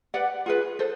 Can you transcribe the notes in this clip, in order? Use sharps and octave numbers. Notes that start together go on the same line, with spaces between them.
G4 B4 D5 F#5
F4 G#4 B4
A4 C5